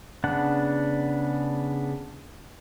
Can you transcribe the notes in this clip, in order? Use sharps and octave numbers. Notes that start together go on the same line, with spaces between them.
C#3 B3 D4 F#5